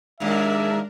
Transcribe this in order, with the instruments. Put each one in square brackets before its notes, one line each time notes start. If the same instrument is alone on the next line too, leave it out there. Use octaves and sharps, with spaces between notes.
[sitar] D#2 A#2 [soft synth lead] G#3 [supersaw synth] D4 A#4 [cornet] E5